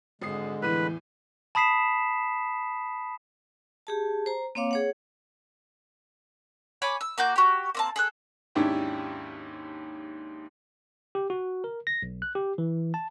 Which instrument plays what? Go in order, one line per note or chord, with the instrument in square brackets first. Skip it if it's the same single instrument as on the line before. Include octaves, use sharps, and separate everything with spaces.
[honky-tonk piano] G#1 D#6 C7 [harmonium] D3 G#3
[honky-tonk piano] E2 A2 D#7 [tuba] E3 [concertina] B4
[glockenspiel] A5 B5 D#6 B6 C7 E7
[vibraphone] G4 G#4 A5
C5 A#5
A#3 C4 C#5 F5 D6
G#4 C#5 F#5
[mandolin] C#5 G#5 B5 D6
E6
A#3 F#4 D6 G6
F#4 G4
A#3 C4 A5
G#4 A4 F#6
[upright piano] D#2 G#2 C#4 D4 E4 G4
[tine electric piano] G4
F#4
A#4
A#6
B1
F#6
G4
E3
A5